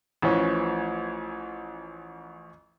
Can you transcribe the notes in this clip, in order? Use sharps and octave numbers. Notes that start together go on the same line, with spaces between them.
A1 E3 F3 C#4